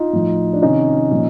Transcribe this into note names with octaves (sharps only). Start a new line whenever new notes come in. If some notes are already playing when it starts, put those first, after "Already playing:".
Already playing: D#4 F4
A2 F3
D4
C3 D#3 C#4 D#4
A#2 F3